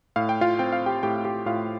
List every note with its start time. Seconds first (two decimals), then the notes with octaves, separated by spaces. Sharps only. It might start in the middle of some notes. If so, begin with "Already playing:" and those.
0.16 A2 F5
0.29 G5
0.41 F4 F5
0.59 C4 G5
0.72 F5
0.86 G4 G5
1.03 A2 G4 G5
1.25 G4 G5
1.46 A2 F4 F5